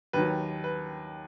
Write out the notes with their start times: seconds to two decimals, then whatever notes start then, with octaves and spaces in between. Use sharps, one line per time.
0.13 D#2 D#3 F#3 B4
0.64 B4